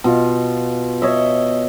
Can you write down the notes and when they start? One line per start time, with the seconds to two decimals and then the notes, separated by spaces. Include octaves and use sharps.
0.04 B2 F4
1.02 C#5 D#5 E5